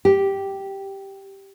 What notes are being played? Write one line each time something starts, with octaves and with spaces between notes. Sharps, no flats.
G4